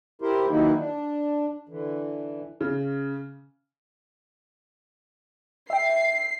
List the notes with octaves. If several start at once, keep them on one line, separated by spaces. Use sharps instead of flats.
E4 G4 A#4 C5
D#3 E3 F#3 A#3 D#4 E4
D4
D3 E3
C#3
E5 G5 C7